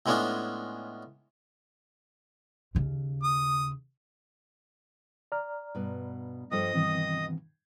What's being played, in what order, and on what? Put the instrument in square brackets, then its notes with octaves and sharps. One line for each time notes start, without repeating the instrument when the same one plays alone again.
[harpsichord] A2 G#3 B3 C#4 D4 F4
[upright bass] D#2 C#3
[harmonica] D#6
[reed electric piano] D5 A#5 F6
[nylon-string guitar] G2 B2
[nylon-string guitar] G2 F3 A4 [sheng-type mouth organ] D#5 D#6
[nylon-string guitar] G2 B2 [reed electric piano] D#3 E3 C4